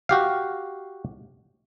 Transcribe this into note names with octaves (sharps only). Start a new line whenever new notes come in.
F#4 G4 F5